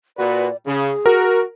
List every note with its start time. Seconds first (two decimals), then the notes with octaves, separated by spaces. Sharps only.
0.18 A#2 F#4 B4 D5
0.66 C#3 G#4
1.06 F#4 A#4